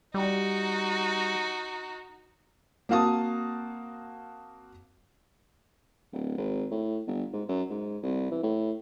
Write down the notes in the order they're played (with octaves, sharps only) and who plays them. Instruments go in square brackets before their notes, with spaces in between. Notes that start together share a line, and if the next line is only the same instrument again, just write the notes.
[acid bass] G3 [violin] D#4 F#4
[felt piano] A#3 C4 F#4 F5 A5 D#6
[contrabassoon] D1
G#1
A2
G1
G#2
F#2
G#2
C2
E3
A2